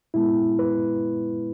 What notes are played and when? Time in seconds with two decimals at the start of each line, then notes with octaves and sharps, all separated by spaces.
0.14 A#2 G#3 B3 E4
0.59 B4